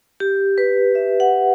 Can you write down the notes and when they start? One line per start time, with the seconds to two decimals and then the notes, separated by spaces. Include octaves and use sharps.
0.20 G4
0.58 B4
0.95 E5
1.20 F#5